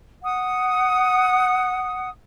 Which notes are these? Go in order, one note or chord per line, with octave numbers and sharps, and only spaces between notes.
F#5 D#6